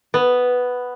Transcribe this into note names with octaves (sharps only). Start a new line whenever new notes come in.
B3